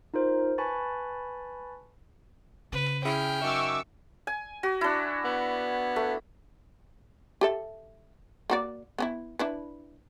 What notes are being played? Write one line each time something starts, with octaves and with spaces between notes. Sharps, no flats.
D#4 F4 A#4 C5
B4 G#5 A5 B5 C#6 A6
C#3 B4
C#4 E4 G#4 G5 F6
F#2 D#4 E5 C#6 D6 E6
G#5
F#4
D4 E4
B3
A3
G4 A4 E5
A#3 F#4 D5
B3 C#4 E4
D4 E4 B4